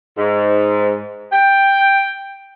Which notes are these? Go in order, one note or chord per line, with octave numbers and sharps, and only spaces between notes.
G#2
G5